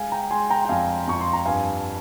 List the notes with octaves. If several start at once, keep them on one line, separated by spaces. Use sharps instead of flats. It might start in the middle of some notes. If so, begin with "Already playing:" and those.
Already playing: G#3 F5 G#5
G5 A#5
G#3 G#5 C6
G5 A#5
G5
F2 F5 G#5
F2 C#6
C6
A#5
G2 F5 G#5